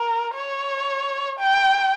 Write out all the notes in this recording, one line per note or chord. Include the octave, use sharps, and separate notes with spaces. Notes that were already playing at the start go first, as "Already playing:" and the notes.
Already playing: A#4
C#5
G5